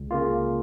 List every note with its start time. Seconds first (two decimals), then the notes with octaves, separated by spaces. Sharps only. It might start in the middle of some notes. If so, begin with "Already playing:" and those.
Already playing: C#2
0.11 C#3 A#3 F4